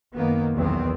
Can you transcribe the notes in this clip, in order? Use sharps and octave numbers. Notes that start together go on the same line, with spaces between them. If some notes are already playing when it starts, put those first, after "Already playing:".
F#2 D#3 A#3 B3
B1 E2 D#3 E3 B3 C4